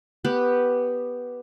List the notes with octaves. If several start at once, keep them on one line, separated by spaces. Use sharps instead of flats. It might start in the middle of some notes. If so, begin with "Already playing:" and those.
B3 G4 B4